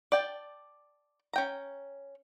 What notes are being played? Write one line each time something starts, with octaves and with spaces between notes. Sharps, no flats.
D5 G5 A5
C#4 G5 A#5